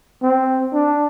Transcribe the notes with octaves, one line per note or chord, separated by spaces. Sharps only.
C4
D4